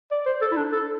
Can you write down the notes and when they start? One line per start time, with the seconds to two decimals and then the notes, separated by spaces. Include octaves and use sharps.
0.11 D5
0.26 C5
0.41 A4
0.52 E4
0.57 D4
0.72 A4